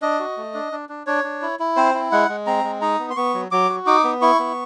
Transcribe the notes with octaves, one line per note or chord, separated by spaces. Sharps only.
D4 D#5
F#4
A3
D4
D4
D4
D4 C#5
D4
E4
E4
C4 C5
E4
G#3 F#5
G#3
C4 A#5
G#3
D#4 A#5
B3
C6
B3 C#6
F#3
F#3 D6
F#4
D#4 D6
B3
E4 C#6
B3